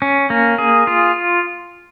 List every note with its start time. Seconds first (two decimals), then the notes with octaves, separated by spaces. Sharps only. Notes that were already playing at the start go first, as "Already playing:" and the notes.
0.02 C#4
0.30 A#3
0.58 G#4
0.87 F4